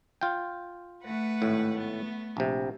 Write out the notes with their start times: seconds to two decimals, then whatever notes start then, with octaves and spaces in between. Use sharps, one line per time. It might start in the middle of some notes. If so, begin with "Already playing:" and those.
0.21 F4 G5
1.04 A3 B4 F#5
1.42 G#1 A2
1.74 A3 B3
2.37 A#1 C3